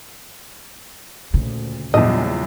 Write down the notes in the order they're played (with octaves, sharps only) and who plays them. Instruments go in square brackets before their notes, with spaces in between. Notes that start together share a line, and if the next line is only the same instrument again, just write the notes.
[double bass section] D2 A#2 [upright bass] C#3
[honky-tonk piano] A#1 E2 [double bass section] A#2 F#3 G3 [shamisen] D#5